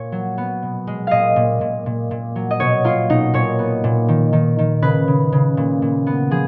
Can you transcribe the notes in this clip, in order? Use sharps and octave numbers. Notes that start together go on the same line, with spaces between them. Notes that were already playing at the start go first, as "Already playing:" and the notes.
Already playing: A#2 C#5
F#3
B3
B2
G#3
A#2 D#5 F5
A#2
A#2
A#2
A#2
F#3
D#5
B2 C#5
A#3 F4
B2 D#4
A#2 C#5
B3
A#2
D#3
D#3
D#3
C#3 B4
C#3
C#3
A#2
A#2
B3
F3 G#4